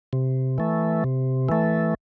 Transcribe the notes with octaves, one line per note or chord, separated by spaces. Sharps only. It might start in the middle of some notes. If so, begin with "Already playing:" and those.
C3
E3 A3
C3
E3 A3